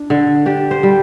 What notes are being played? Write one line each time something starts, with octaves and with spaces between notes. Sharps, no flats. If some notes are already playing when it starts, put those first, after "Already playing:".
Already playing: D4
D3
D4 G4
C5
G3